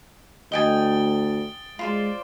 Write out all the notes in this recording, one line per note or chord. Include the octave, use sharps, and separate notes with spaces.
D2 D#5 G5 G#5 A6 D7 G7
G#3 F4 C5 D5